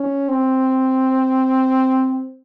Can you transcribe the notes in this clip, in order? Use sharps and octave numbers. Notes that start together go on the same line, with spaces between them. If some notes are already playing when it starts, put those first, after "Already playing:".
Already playing: C#4
C4